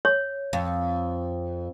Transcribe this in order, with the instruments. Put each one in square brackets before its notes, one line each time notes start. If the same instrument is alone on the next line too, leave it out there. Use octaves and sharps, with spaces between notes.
[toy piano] C#5
[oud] F2